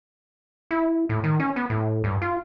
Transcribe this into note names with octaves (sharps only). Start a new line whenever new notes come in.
E4
A2
D#3
C#4
B3
A2
G2
F4